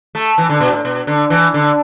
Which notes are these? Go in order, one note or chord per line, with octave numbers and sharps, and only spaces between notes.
A3
E3
D3
B2
A2
B2
D3
E3
D3